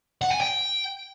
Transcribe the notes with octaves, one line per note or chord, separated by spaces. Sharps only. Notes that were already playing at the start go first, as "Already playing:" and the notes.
F#5
G#5
G5